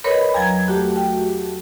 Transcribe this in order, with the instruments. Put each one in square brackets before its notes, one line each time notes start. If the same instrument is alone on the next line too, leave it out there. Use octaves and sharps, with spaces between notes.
[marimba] A#4 B4 C#5 [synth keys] D#5 B5
[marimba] E2 F#3 [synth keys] A#5 G#6
[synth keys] A3 F#4 G4
[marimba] G5